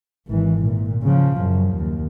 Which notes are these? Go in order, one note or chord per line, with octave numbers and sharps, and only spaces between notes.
G#1 E3
A#2
C#3 F3
F#2
D#2